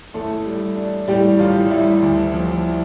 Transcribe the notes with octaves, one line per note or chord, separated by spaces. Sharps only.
A1 A3 A4
G3
D4
A2 G3 G4
A1 F4
G3 E4
D2
F3